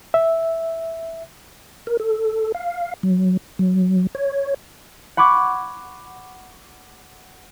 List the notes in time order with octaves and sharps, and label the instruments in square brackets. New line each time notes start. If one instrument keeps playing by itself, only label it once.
[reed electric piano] E5
[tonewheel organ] A#4
A4
F5
F#3
F#3
C#5
[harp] F#5 B5 C#6 D6 G#6